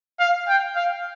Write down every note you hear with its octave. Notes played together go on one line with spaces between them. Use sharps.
F5
G5
F5